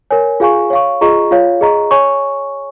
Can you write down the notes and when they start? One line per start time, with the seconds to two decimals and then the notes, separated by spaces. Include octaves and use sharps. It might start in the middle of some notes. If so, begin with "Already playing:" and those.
0.11 A#4 C#5 G#5
0.40 F4 G#4 F5 G#5 C#6
0.70 C#5 F5 C#6
1.01 F4 G#4 D#5 A#5 C#6
1.31 F4 C#5 F5
1.61 G#4 D#5 A#5 C#6
1.91 C#5 G#5 C#6